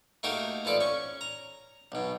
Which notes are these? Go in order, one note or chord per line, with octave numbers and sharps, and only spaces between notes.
A3 A#3 D#4 F#4 G4 A#4
E3 F3 A4 D5
C#4 C#6
A#5
B1 B2